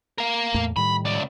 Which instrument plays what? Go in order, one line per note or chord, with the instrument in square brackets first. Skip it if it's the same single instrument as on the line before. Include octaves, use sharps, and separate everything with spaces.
[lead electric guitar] A#4 F5
[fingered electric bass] E2 A2 A3
[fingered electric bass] A2 D#3 G3 [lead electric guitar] B5
[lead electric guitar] C#2 D5